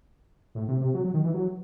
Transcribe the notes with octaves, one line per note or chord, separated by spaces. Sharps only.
A2
C3
C3
F#3
F#3
D#3
E3
F#3